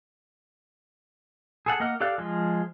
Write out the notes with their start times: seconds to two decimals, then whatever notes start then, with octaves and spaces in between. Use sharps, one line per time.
1.66 G#4 A4 F#5
1.80 A#3 D#5 F#5 F6
2.00 G4 A4 D5 F5 F#6
2.18 F3 G#3 F6